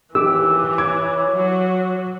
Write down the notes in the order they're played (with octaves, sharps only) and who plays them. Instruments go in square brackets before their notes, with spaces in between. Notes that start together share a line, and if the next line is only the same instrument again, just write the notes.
[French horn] D#2 [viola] E3 [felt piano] G4 [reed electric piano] D6 E6
[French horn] C#5 [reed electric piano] D6 [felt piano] G#6
[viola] F#3 F#4